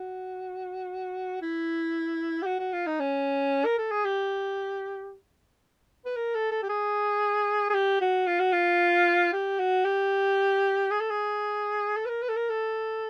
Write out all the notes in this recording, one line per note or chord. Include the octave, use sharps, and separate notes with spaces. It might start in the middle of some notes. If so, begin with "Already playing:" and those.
Already playing: F#4
E4
G4
F#4
F#4
F4
D#4
C#4
A#4
A4
G#4
G4
B4
A#4
A4
A4
G4
G#4
G#4
G4
F#4
F4
F#4
F4
G4
F#4
G4
G#4
A4
G#4
A4
B4
A#4
B4
A4
A#4
A4